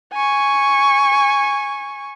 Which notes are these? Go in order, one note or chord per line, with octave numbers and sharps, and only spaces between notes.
G#5 C#6